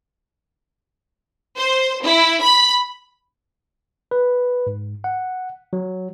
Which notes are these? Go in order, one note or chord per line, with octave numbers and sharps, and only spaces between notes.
C5
E4
B5
B4
G#2
F#5
F#3